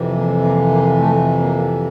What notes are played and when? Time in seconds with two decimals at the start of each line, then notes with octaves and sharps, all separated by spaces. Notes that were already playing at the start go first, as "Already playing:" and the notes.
Already playing: F2 C3 E3
0.15 A#3
0.43 A#3
0.71 A#3
0.99 A3
1.40 A#3